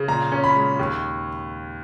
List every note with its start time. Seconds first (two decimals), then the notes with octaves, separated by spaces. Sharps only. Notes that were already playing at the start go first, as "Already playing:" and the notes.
Already playing: C#3
0.08 A#2 A#5
0.32 C#4
0.44 B5
0.55 G#3
0.79 D#2